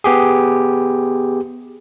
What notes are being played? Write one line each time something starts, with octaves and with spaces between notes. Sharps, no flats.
B3 G4 G#4